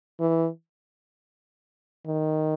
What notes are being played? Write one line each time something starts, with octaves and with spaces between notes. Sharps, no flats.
E3
D#3